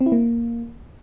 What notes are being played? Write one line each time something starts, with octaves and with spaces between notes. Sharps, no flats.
C4
E4
A#3